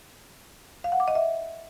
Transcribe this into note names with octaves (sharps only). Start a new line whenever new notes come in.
F5
F#5
D6
D#5
E5